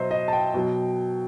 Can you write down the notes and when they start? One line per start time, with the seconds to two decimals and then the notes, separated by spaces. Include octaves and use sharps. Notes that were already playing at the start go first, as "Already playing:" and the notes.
Already playing: B2 F#3 C5 D#5 E5
0.11 D#5
0.28 A5
0.33 G5
0.54 B2 F#3